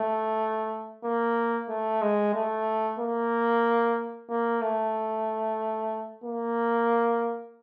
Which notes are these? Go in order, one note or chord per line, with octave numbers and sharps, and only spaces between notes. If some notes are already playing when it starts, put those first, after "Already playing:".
Already playing: A3
A#3
A3
G#3
A3
A#3
A#3
A3
A#3